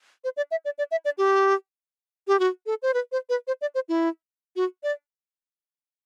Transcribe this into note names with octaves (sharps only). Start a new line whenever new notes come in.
C5
D5
E5
D5
D5
E5
D5
G4
G4
F#4
A4
C5
B4
C5
B4
C5
D5
C5
E4
F#4
D5